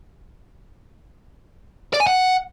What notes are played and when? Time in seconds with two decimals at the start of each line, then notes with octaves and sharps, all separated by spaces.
1.94 D5
2.00 G#5
2.07 F#5